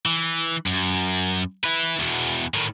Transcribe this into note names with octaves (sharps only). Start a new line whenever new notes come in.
E3
F#2
E4 B4
E2 B2
A2 D#3